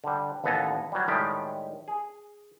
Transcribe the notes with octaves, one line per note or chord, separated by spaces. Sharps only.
D3 G3
A1 D#2 B3 A4 G#5 A#5
F#3 G3
A2 D#3 G3 G#3 G4
G#4